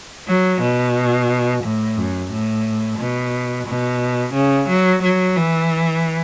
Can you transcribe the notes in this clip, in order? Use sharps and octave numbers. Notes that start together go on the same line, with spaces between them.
F#3
B2
A2
F#2
A2
B2
B2
C#3
F#3
F#3
E3